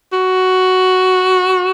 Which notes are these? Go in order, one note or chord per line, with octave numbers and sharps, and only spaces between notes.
F#4